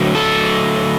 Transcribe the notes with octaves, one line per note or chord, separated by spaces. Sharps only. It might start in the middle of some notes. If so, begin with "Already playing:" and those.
Already playing: D3 F#3 A3
A4